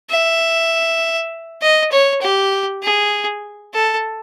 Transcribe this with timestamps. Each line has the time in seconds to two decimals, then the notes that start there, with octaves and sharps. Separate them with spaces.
0.10 E5
1.62 D#5
1.92 C#5
2.21 G4
2.83 G#4
3.74 A4